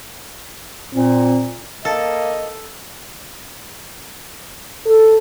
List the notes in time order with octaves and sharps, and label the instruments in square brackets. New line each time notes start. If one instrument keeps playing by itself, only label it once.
[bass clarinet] A#2 [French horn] C4
[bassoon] A#3 [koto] A4 [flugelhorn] D#5
[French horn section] A4